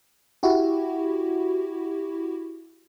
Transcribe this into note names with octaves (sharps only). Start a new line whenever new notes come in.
E4 F#4 G4